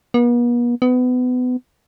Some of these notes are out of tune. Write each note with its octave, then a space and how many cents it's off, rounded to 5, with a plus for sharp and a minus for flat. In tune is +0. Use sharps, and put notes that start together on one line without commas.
B3 -45
B3 +25